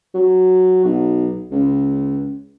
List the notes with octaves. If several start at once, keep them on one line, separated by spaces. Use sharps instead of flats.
F#3
B1
C#2